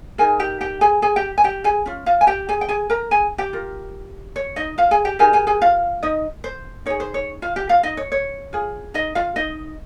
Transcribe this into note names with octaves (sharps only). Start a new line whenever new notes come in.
D#4 G#4 A#4 G#5
G4 G5
G4 G5
G#4 G#5
G#4 G#5
G4 G5
G#5
G4 G5
G#4 G#5
C#4 F4
F4 F5
G#5
G4 G5
G#4 G#5
G5
G#4 G#5
A#4 A#5
G#4 G#5
G4 G5
F4 A#4
C#5
D#4 D#5
F4 F5
G#4 G#5
G4 G5
D#4 G4 G#4 A#4 G#5
G#4 G#5
G#4 G#5
F4 F5
D#4 D#5
C5
D#4 G#4 C#5
C5
C#5
F4 F5
G4 G5
F4 F5
D#4 D#5
C#5
C#5
F4 G#4
D#4 D#5
F4 F5
D#4 D#5